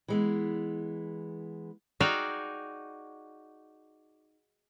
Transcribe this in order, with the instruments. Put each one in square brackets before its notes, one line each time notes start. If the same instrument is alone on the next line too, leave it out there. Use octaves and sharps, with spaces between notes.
[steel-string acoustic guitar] E3 G#3 B3
[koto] D#4 F#4 G#4 D5 F5 G5